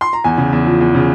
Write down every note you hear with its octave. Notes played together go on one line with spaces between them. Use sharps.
C6
A#5
E2 G#5
C#3
E2
F3
E2
C#3